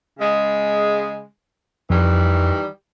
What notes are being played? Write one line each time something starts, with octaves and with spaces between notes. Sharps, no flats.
C#3 G#3
F2 D#3 E3 G3